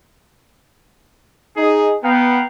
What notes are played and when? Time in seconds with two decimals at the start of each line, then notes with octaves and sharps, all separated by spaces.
1.57 D#4 G#4
2.03 B3 F5 G5 A#5